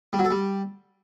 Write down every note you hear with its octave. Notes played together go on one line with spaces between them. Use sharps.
G3
F#3
A4
G3